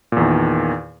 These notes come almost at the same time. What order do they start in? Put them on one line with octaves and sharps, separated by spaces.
A#2 E2 D#3